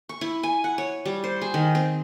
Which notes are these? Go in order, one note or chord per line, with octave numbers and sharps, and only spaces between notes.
C#6
E4
G#5
F#5
C#5
G3
C5
G#4
D#3
C4